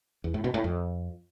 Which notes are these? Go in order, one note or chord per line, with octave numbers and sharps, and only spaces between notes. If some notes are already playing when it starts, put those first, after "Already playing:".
E2
A2
B2
A2
F2